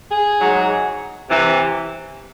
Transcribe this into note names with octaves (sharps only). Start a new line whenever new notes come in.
G#4
G#2 F#3
C3 E3